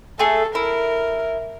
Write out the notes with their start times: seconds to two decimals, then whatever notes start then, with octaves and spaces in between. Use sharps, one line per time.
0.19 A3 G#4 A4
0.55 E4 A#4